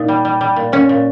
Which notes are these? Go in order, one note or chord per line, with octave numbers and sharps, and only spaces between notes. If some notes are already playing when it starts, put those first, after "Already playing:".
Already playing: A#2 D#4
G3
G3
G3
A#2
A#2 C#4
A#2